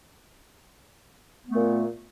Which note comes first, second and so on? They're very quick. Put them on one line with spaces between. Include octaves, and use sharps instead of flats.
B3 A3 A#2